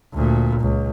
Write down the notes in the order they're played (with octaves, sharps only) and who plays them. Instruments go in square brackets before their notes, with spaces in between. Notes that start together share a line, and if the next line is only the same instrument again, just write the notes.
[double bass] D2 A#2
C#2